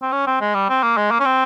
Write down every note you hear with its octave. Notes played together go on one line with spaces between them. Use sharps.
C4
C#4
C4
G#3
G3
C4
A#3
G#3
A#3
C#4
C4